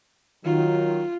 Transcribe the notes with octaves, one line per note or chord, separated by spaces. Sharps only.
D#3 F#3 F4